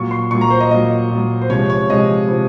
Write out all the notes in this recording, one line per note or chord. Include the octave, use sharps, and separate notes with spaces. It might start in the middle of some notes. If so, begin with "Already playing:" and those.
Already playing: A#2 F#3 C#6
C6
A#2 F#3 C#6
A#5
C5
D#5
A#2 F#3 D#5
A#2 F#3
C5
C3 F3 G#3 C#5
C#5
C3 F3 G#3 D#5
C3 F3